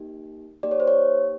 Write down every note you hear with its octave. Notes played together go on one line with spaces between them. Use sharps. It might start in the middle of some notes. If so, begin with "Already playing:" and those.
Already playing: A#3 D#4 G4
A#3 D#4 G4 D5
C#5
C5
C#5